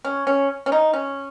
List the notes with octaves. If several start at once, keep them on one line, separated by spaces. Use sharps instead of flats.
C#4
C#4
C#4
D#4
C#4